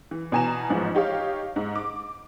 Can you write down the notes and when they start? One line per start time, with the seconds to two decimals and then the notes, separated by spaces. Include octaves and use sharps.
0.11 E3
0.32 B2 E3 G#5 A#5 E7
0.69 A1 G#2 F3
0.95 D#4 G4 C#5 F5
1.56 G#2
1.75 D6